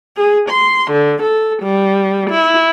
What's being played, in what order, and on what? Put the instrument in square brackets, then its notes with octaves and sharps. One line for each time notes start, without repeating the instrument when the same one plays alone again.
[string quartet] G#4
C6
D3
A4
G3
E4